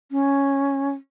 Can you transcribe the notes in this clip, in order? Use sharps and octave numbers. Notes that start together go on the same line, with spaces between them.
C#4